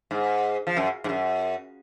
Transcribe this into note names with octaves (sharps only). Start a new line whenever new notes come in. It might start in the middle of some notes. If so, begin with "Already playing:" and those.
G#2
F3
F#2
G#2
F#2